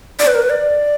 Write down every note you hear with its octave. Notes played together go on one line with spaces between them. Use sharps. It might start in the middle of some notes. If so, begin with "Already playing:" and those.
D5
B4
A#4
B4
D5